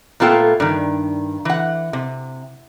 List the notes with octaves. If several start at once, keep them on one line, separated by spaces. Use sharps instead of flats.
A#2 A3 B3 F4 A4 G5
G2 D#3
E3 F#5
C3